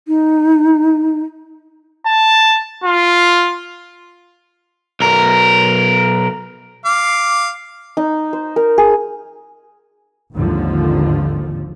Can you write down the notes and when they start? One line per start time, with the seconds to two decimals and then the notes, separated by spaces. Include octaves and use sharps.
0.08 D#4
2.06 A5
2.84 F4
5.00 B1 A#4
6.85 F5 D6
7.97 D#4
8.33 C5
8.56 A#4
8.78 G#4
10.35 G#1 D#2 D3 F3